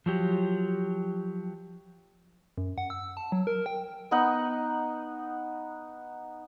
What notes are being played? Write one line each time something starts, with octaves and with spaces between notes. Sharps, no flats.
F3 F#3 G4
F#2
F#5
E6
A5
F#3
A#4
G5
B3 D#4 F#5